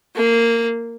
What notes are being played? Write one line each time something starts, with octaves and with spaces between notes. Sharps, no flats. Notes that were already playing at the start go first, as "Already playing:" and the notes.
A#3